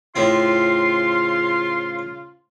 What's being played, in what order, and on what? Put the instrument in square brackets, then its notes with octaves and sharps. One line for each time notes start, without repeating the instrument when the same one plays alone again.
[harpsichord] A2 C4 [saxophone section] C#3 F4 [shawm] C6